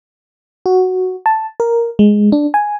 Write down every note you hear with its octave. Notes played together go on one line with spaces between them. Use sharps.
F#4
A5
A#4
G#3
D4
G#5